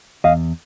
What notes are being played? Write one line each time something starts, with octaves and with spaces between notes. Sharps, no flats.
E2 D#5 F5